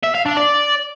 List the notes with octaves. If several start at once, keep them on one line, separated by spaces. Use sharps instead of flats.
E5
F5
D4
D5